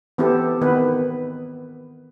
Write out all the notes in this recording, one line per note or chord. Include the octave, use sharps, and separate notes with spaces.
E3 B3 C4 E4 G4 A4
D#3 B3 B4